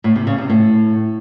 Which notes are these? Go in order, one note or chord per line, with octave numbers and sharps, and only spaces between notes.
A2
C3
C#3
C3
A2